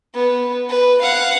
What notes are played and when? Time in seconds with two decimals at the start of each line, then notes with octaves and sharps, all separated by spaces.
0.15 B3
0.70 B4
1.02 F5 F#5